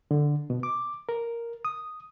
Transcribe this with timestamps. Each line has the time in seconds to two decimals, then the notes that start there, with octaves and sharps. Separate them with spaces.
0.11 D3
0.50 B2
0.63 D6
1.09 A#4
1.65 D#6